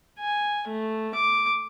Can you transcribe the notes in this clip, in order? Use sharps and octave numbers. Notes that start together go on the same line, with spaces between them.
G#5
A3
D6